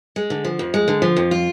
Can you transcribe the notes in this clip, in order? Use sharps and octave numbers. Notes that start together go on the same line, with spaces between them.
G#3
D3
F3
F2
G#3
D3
F3
F2
F4